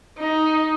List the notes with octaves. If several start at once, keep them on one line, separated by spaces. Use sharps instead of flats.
D#4